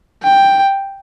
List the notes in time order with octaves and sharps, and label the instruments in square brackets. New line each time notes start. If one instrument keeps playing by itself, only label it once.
[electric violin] G5